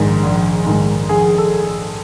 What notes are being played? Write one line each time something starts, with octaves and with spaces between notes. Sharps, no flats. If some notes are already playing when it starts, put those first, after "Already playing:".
Already playing: A#1 G#2 D#3 G#3
A#1
G#2 D#3 G#3
A#1 G#4
A4